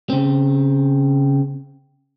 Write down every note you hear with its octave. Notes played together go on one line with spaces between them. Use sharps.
C#3 C4